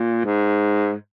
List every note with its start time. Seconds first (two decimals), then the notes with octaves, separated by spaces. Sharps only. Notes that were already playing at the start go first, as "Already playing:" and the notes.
Already playing: A#2
0.25 G#2